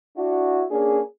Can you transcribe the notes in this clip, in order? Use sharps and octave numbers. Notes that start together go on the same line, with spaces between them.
D4 E4 F#4
A#3 C#4 D4 G#4